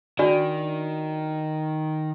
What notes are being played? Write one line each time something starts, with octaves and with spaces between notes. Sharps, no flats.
D#3 D4 F#4 D5